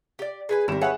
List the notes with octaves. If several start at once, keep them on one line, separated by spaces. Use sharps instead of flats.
G4 D5
G#4 B4 G#5
G#1 G3 E4 A#4 E7
G#4 B4 C#5 E5 F#5